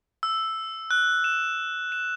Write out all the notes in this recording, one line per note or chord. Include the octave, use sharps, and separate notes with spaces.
E6
F#6
E7
E7